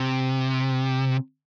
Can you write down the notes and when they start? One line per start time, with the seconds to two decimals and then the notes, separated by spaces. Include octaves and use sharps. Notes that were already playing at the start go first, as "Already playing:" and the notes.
Already playing: C3